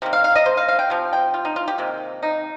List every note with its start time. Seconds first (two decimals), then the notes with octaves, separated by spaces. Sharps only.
0.02 C3 D#3 A#3
0.13 F5
0.24 F5
0.35 D#5
0.46 C5
0.57 F5
0.68 F5
0.79 G5
0.90 C3 F3
1.13 G5
1.34 F4
1.45 D#4
1.56 F4
1.68 G4
1.78 C3 D#3 A#3
2.23 D#4